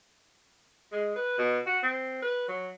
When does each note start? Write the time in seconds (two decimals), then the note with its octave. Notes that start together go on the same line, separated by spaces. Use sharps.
0.92 G#3
1.16 B4
1.38 B2
1.66 F#4
1.83 C4
2.22 B4
2.48 F#3